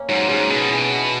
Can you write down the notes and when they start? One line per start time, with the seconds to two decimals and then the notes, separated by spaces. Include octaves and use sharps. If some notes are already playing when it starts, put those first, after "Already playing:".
Already playing: A#3 C#4
0.09 G#2 F#3
0.29 G#2 C#3
0.49 B2 D#4
0.70 E3
0.91 B3